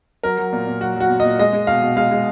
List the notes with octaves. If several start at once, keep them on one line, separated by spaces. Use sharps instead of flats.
F#3 A#4
F#3
A#2
A#2
F#3 F#4
F#3 F#4
A#2
D#5
A#2
G#3 D#5
G#3
B2 F5
B2
G#3 F5
G#3